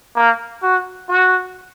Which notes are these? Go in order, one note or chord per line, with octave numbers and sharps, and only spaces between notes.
A#3
F#4
F#4